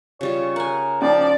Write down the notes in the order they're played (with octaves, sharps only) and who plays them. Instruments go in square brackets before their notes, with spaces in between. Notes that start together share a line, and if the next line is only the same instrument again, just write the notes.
[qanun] C#3 G3 F4 [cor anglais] C#5
[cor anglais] A#4 [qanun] F#5 G#5
[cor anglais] F3 [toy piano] C#4 D#4 [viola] D5